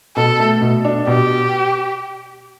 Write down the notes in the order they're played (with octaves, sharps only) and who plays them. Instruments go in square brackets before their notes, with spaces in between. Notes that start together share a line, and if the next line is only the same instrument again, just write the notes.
[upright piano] B2 [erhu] A4
[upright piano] A3
B2
D4
[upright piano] B2 [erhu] G4